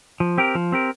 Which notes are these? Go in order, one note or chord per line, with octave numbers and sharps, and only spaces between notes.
F3
C4 G4 A#4
F3
C4 G4 A#4